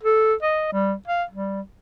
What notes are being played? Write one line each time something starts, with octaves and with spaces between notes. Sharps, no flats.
A4
D#5
G3
F5
G3